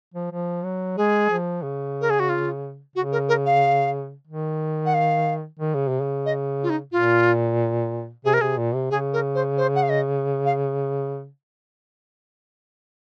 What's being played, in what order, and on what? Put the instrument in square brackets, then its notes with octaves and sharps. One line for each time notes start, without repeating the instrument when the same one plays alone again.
[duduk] F3
F3
F#3
[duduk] G#3 [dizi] G#4
[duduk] F3
C#3
[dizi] A#4
G#4
F#4
F4
[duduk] C#3 [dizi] F#4
[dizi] A#4
A#4
F5
[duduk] D#3
[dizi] F#5
F5
[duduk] D#3
C#3
C3
C#3
[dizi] D#5
F4
D#4
[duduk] A#2 [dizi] F4
[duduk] C3 [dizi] G#4
[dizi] A#4
[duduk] C3 [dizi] G#4
[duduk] A#2
C3
[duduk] C#3 [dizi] G#4
[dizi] A#4
C5
C5
F#5
F5
D#5
F5